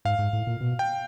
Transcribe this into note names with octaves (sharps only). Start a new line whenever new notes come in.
G#2 F5
G#2
A2
A#2
B2
G5